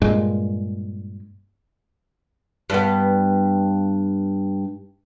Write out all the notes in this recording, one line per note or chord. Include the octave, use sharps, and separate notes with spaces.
G2 A#2 G#3
G2 B3